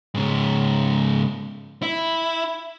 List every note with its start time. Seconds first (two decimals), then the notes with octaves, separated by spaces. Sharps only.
0.14 G#2 C#3
1.82 E4